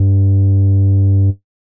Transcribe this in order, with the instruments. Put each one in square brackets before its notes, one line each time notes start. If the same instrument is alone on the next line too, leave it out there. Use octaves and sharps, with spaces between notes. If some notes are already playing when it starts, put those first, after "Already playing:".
Already playing: [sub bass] G2